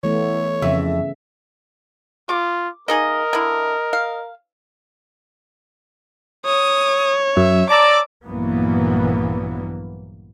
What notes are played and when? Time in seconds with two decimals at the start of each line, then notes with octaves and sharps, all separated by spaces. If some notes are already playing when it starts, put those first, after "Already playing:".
0.03 E3 A3 B3 C#5
0.62 F2 C#3 E5
2.29 F4 D6
2.88 A#3 D#4 G#4 A#4 D#5
3.33 D3 E4
3.93 F5
6.46 C#5 D#6
7.37 F#2 E5
7.70 D5 A5 A#5 D6 E6
8.26 A#1 G2 E3 F#3 A#3 B3